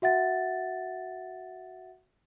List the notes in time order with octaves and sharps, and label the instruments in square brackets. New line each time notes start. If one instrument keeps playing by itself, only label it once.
[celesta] F#4 E5 F#5 A6